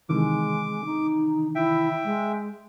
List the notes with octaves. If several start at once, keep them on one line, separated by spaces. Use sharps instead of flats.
C3 D#3 E3 G#3 D6
D#4
E4 E5 G5
G#3